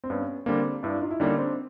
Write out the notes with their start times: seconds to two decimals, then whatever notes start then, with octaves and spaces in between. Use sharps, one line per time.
0.04 C4
0.10 G2 B3 C#4
0.46 D3 G3 A#3 C4 D4
0.83 G2 D4 E4
1.02 D#4 F4
1.11 E4
1.20 D3 G3 A#3 C#4 D#4
1.38 C4 D4